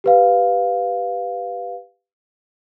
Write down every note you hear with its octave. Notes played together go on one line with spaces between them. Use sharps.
G4 B4 F5